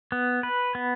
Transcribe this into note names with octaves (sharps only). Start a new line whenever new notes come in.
B3
B4
B3